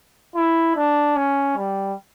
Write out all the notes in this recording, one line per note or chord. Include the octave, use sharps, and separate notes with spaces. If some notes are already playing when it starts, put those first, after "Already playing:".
E4
D4
C#4
G3